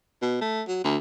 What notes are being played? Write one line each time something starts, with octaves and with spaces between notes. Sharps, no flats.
B2
A3
F#3
D2